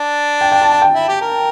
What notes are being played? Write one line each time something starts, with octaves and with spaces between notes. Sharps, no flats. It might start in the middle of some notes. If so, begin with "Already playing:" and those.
Already playing: D4
G5
G5
A5
A5
G5
E4
G4
A#4